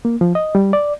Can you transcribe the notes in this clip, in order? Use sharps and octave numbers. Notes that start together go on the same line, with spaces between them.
A#3
F3
D#5
G3
D5